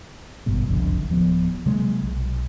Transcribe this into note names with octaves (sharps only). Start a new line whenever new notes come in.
G#1 G2 B2
F#1 C2 F2 D3
D1 F3 B3
C3 F#3 G#3 A#3
B1